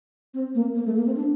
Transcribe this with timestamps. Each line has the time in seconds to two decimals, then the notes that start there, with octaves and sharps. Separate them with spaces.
0.34 C4
0.55 A#3
0.75 A#3
0.85 A3
0.95 A#3
1.06 C4
1.16 D4